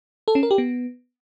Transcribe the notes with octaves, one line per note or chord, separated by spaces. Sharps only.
A4
C#4
A#4
G4
B3